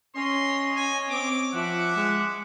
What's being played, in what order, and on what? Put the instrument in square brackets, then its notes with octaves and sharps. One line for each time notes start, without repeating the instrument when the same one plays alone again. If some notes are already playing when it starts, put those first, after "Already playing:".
[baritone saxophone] C#4 [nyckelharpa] C#5 D#5 [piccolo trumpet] C6
[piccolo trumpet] G#5
[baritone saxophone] C4 [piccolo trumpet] D6
[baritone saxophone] F3 [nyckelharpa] E5 D6 [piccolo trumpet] F#5
[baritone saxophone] G#3